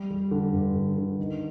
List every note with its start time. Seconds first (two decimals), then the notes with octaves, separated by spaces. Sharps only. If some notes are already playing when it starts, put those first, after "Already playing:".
Already playing: G3
0.11 G3
0.31 D3
0.53 G2
0.76 D3
0.98 D3
1.19 D#3